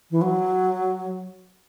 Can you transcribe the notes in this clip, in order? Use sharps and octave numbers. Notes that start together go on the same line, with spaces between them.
E3
F#3